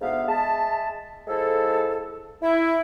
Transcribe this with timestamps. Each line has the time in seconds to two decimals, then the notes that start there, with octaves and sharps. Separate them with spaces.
0.01 D2 G#2 B3 E5 F5
0.28 G#3 G#4 E5 A5
1.28 F3 G#3 E4 A4
2.42 E4